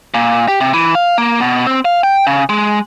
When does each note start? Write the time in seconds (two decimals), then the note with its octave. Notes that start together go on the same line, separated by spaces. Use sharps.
0.14 A#2
0.48 G4
0.61 C3
0.74 E3
0.95 F5
1.18 A#3
1.40 B2
1.66 C4
1.85 F5
2.04 G5
2.27 C#3
2.49 G#3